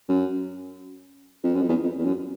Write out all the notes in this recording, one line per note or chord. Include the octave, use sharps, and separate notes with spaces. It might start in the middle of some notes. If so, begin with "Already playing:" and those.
F#2
F2
F#2
F2
E2
F2
E2
F#2